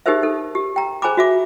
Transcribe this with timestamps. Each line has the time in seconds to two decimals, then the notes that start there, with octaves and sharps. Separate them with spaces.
0.06 D#4 G4 G#4 A#4 C5 E5
0.23 D#4 A4
0.55 G4
0.76 G5 A#5
1.02 G#4 C5 G#5 A#5 B5 D6
1.17 F#4 E5 D6